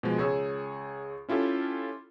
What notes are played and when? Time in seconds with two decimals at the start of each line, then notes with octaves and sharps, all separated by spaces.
0.03 B2 F3 G#3
0.18 C#2 G#4 C#5 E6
1.29 C#4 E4 F4 G4 A4